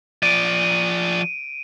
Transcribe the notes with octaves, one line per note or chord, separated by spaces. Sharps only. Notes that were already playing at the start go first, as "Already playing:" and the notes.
F3 D5 D7 D#7